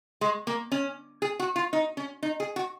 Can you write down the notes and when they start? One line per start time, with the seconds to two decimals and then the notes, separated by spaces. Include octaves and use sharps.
0.21 G#3
0.47 A#3
0.72 C#4
1.22 G#4
1.40 F#4
1.56 F4
1.73 D#4
1.97 C#4
2.23 D#4
2.40 G#4
2.56 F#4